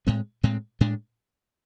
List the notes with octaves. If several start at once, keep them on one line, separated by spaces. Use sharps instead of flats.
A2 G#3 C4
A2 G#3 C4
A2 G#3 D4